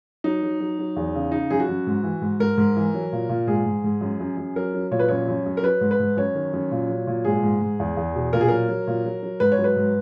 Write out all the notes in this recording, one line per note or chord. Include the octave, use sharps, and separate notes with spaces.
F#3 D#4
F#3
F#3
F#3
E2
C#3
C#3 D#4
F#2 G#4
F#4
F#2
G#2
E3
G#2
G#2 A#4
G#2
E3
F#3
A#2
A#2
G#2 G#4
G#2
G#2
F#2
F#2
F#2
F#3 A#4
F#3
A#2 C#5
B4
F#2 C#5
F#2
F#2
A#4
F#3 B4
G#2
B4
G#2
F#2 C#5
D#3
F#2
A#2
F#3
A#2
G#2 G#4
G#2
G#2
E2
E2
B2
A#2 A#4
G#4
F#3 A#4
F#3
A#2
F#3
F#3
G#2 B4
C#5
F#3
B4
G#2